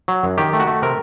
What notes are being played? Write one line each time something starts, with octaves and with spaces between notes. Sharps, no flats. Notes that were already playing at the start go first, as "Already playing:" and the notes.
F#3
F#2
D#3 G4
A3
F#4
A3
C3 A#4